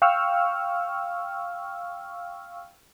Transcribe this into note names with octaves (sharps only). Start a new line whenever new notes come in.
F5 G5 C#6 E6 F6